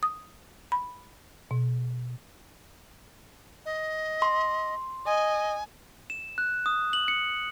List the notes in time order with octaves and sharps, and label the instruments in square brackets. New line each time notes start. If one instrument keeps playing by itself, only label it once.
[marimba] D#6
B5
B2
[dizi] D#5
[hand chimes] C6
[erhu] D#5 [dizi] G#5
[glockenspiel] E7
F#6
D#6
F#7
C#7